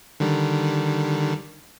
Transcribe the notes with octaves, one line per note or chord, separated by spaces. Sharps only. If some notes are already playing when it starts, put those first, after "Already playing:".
D3 D#3 G3